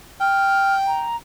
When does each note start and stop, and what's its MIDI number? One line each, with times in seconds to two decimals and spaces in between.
0.20 1.08 79
0.20 0.75 89
0.87 1.16 82